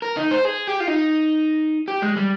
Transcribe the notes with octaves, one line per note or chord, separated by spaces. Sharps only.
A#4
D#4
C5
G#4
G4
F4
D#4
G4
G#3
G3